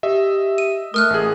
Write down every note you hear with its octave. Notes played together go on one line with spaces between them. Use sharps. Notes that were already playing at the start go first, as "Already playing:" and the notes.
G4 D#5 E5
D#7
A3 A#4 D#6 F6 F#6
A1 G#4